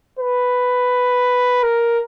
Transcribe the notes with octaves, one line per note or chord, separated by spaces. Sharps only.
B4
A#4